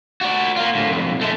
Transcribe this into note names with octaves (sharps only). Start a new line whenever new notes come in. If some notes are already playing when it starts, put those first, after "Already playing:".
F#4 D5
A#3 F4
D2 A2
B1 F2
G#3 A3